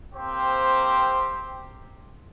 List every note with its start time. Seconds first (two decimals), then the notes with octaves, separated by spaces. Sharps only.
0.14 A#3 C4 G4 C5